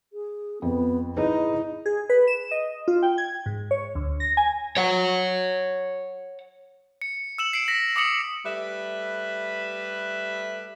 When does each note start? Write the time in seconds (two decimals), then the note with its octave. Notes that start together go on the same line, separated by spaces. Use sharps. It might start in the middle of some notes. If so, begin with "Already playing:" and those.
0.13 G#4
0.62 F2 B3
1.17 D#4 E4 G#4 B4
1.86 G#4
2.10 B4
2.28 E7
2.51 D#5
2.88 F4
3.02 G5
3.18 G#6
3.46 G#2
3.71 C#5
3.95 D2
4.20 A#6
4.37 G#5
4.77 C#5 F#5
7.02 C#7
7.38 E6 E7 F#7
7.53 C7 D7
7.68 A#6 B6
7.96 D6 D#6 C#7 F#7
8.46 G3 A3 B4 E5